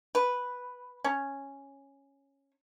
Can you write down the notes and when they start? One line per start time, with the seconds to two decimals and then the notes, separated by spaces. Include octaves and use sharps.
0.15 B4
1.05 C#4